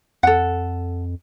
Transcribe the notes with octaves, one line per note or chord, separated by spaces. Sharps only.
F2 A4 F#5